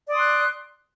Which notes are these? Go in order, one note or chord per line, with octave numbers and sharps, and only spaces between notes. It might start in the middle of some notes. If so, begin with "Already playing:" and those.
D5 C6 D#6 F#6